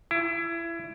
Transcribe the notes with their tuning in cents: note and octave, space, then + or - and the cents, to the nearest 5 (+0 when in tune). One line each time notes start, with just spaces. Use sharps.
E4 +25